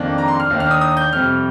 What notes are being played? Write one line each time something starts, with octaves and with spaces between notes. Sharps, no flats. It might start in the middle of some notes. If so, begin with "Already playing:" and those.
Already playing: F2 D#3 A#3 D4
A#5
C6
F6
D#2 D#3 A#3 D4
F6
D#6
D#6
G6
F2 C3 G3 F6